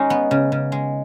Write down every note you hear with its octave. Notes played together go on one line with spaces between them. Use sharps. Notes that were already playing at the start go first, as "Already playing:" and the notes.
Already playing: G#3 C#4 D#4
B3
C#3
C#3
G#3